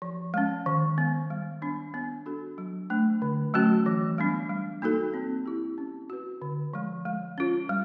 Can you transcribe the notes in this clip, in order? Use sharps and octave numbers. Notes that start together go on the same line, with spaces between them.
F3
G#3 C#4
D#3
G#3 B3
G3
B3 D4
B3
D4 F#4 A4
F#3
A3 D4
D3
F#3 A3 C#4 F#4
E3
G3 B3 D4
G3
A#3 D#4 F#4 A4
C4
E4 G4
C#4
F#4 B4
D3
F3 G#3
G#3
C#4 F4
G3